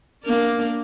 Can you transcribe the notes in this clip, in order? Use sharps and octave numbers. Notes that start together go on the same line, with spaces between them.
A#3 D4